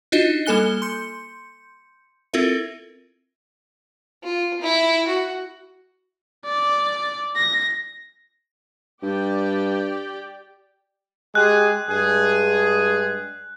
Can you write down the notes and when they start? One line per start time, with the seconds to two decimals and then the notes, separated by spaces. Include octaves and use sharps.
0.12 D4 D#4 F4 F#4 D#5
0.46 G3 A#3 A4 G#5 F#6 G7
0.82 C6 G6 C#7
2.33 C4 E4 F4 A4 A#4 E5
4.24 F4
4.62 E4
5.08 F#4
6.46 D5
7.36 A#6
9.02 G2 G4 D5 G5
11.35 G#3 G4 G#4 F#6
11.89 G2 G#3 G#4